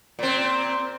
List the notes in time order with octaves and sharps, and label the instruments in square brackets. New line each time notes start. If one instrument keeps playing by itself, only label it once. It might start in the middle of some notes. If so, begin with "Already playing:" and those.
[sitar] A#2 C4